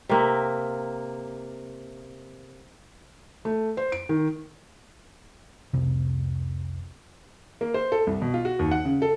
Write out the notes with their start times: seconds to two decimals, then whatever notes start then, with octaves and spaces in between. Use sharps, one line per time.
0.09 C3 A#3 E5
3.45 A3
3.77 C5
3.92 D7
4.09 D#3
5.73 F1 C2 C3
7.61 A#3
7.74 C5
7.92 A4
8.07 C2
8.22 B2
8.34 F4
8.45 F#4
8.59 D#2
8.71 F#5
8.85 C#3
9.02 A4